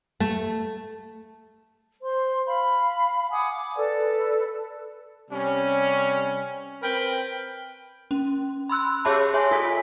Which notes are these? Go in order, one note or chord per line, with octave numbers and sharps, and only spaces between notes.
A3
C5 C6
F5 B5
F#5 G#5 D6 D#6
D6
A4 B4 D5
C3 G3 C#4
C4 A#4 B4 G5
C#4
B5 C6 E6 F#6
G4 G#4 C#5 E5 A5 B5
C#5 E5 G#5 C6
F4 A4 G#5 B6